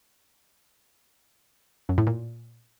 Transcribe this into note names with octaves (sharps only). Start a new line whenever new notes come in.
F#2
A2
A#2